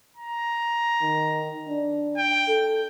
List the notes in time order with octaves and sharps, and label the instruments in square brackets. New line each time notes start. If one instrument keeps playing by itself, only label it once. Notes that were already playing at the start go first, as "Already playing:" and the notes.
[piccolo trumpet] A#5
[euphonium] D#3
D4
[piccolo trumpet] G5
[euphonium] A4